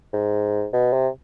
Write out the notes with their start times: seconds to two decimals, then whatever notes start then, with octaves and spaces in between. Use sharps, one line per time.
0.13 G#2
0.73 B2
0.93 C3